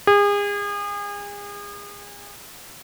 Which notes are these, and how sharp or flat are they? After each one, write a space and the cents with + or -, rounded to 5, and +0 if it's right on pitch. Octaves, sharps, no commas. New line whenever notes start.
G#4 -35